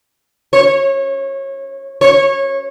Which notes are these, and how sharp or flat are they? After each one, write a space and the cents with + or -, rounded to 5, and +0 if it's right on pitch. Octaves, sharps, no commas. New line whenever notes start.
C#5 -25
C#5 -20